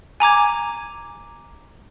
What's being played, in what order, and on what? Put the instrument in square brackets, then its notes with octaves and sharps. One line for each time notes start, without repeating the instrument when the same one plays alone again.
[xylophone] G#5 A#5 D6 G#6